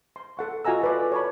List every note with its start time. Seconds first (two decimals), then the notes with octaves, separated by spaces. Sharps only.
0.16 C6
0.37 A4 F#5 C#6
0.65 F4 F#4 D#5 G#5 A#5 E6
0.81 A4 B4 D5
1.12 C#5 A5 B5